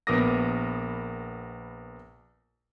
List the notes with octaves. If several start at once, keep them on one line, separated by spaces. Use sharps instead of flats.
A#1 B3 A#4 D6 D#6 A#6